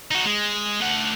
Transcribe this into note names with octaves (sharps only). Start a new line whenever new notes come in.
D#4 F#4
G#3
A3 F#5